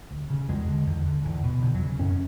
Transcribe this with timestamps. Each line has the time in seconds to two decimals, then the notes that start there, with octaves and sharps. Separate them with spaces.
0.11 D2
0.30 C#3
0.49 E2 G#3
0.68 D3
0.86 E2
1.05 D3
1.25 E2
1.44 B2
1.62 E2 D3
1.75 F#3
1.81 C#3
1.99 F#2 C#4